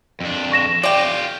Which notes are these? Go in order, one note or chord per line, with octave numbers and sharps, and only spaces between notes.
F2 D4
C#6 A#6 E7
F4 G4 D5 G5